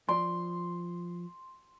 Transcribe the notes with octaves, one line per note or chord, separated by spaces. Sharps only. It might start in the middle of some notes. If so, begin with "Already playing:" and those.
F3 D5 C6